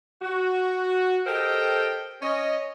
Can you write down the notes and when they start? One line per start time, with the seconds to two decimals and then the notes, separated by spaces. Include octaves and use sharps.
0.22 F#4
1.26 G4 A4 A#4 C5 D#5 G5
2.22 C#4 D#5